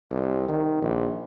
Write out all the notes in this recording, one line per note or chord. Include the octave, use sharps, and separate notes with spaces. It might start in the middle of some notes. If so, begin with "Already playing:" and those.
C2
D#3
A#1